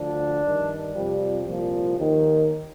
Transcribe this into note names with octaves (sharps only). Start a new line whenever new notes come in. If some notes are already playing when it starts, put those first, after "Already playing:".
Already playing: D2 D3 F3 D4
G2 D#3
F2 C3 F3 G3
C2 A#2 F3
D#2 D#3